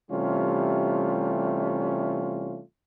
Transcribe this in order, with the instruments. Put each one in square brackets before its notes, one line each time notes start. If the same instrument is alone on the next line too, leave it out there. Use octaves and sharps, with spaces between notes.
[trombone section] C3 E3 G3 A3 C#4 F4